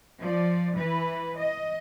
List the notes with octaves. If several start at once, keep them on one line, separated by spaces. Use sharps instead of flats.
F3 D5
E3 B4
D#5